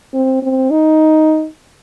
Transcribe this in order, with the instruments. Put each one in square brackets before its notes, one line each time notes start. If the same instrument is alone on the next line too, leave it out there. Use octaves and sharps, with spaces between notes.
[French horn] C4
C4
D#4